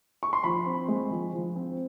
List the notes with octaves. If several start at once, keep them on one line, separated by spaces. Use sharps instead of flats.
C#6
C6
F3 B5
C4
G#3
F3
F3
C4